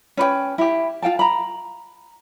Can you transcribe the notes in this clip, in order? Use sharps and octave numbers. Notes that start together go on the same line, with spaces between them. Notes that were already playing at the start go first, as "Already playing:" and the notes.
C#4 B4 C#5 G5
E4 G4
F4 F5 G5 A5
A#5 B5